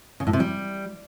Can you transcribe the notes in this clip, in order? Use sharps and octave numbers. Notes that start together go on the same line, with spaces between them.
C#3
A2
C3
G3